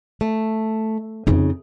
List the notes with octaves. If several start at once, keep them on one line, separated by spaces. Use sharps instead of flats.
A3
F2 C#3 D#4